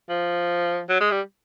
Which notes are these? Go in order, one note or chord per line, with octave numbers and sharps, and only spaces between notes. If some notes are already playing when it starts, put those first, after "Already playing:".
F3
F#3
G#3
G3